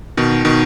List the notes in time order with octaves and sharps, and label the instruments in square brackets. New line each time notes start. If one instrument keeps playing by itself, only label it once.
[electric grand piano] B2 D#3
B2 D#3